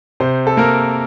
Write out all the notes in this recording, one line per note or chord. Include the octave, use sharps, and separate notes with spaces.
C3 C5
A4
A#3 A#4